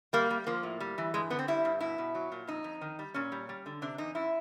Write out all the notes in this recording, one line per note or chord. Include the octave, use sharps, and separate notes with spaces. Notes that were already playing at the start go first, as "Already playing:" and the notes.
G3 A#3
G3
F3 A#3
A2
G3
E3
G2 G#3
D3 B3
C4
G3 E4
G2
B2 E4
B2
F#3
A#2
F2 D#4
F2
D#3
G3
A#2 C#4
G3
G3
D3
C3 D4
E2 D#4
F#2 E4